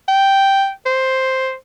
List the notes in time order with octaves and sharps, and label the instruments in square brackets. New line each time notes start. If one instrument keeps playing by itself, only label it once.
[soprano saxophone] G5
C5